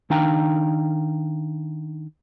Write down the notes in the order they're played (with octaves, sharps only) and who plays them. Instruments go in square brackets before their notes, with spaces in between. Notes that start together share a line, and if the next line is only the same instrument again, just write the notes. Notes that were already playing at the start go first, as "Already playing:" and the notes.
[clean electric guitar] D#3 D4 D#4 F5 G5 A#5